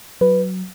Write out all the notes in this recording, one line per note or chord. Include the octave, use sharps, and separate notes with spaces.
F#3 B4